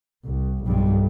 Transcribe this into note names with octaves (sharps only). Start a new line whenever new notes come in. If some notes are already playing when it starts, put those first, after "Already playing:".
C2
B1 G2